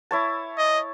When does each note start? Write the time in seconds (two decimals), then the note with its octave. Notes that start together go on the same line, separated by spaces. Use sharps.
0.11 E4 C#5 A5
0.58 D#5